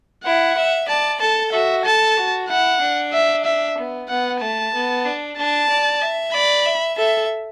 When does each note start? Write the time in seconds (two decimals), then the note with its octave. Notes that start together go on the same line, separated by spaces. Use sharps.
0.24 E4 F#5
0.57 E5
0.88 D5 A5
1.21 A4 A5
1.52 F#4 E5
1.85 A4 A5
2.17 F#4
2.49 E4 F#5
2.81 D4
3.13 E5
3.45 E5
3.77 B3
4.09 B3 F#5
4.41 A3 A5
4.74 B3
5.05 D4
5.37 D4 A5
5.69 D5
6.01 E5
6.33 D5 B5
6.65 E5
6.97 A4 E5